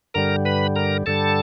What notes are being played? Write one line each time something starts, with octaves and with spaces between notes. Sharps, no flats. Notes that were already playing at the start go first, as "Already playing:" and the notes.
G2 D3 G3 A#4 A#5
B4 B5
A#4 A#5
G2 D3 G3 A4 A5